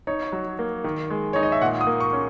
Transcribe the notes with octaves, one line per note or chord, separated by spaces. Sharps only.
D#4 C#5
F#3
A#3
D#3
G#3
D#4 C#5
D#5
E5
A#2 F#5
D#6
A#3
C#6
C#4